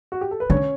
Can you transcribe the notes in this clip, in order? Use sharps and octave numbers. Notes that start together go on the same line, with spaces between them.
F#4
G4
A4
B4
D3 C#4 C#5